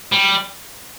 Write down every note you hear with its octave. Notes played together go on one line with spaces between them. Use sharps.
G3